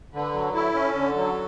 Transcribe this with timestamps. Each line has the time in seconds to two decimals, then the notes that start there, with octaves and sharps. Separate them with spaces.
0.14 D3 B4
0.34 F#3
0.55 E4 A4
0.75 C#4
0.95 D3
1.15 F#3